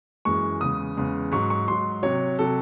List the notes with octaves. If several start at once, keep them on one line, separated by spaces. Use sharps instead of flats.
F#2 E3 G#3 C#6
E2 C#3 G#3 D#6
E2 C#3 G#3
G#2 F#3 C#6
C#6
G#2 F#3 C6
C3 F#3 C#5
C3 F#3 A4